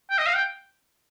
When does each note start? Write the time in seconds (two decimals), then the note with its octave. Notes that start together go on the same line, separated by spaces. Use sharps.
0.10 G5
0.18 D#5
0.26 F5
0.35 G5